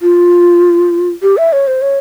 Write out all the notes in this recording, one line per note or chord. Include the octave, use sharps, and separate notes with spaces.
F4
G4
E5
C#5
C5
C#5